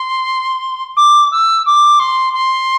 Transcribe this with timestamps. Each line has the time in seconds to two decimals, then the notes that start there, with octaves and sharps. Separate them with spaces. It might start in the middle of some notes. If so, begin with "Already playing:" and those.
Already playing: C6
0.96 D6
1.31 E6
1.66 D6
1.99 C6
2.33 C6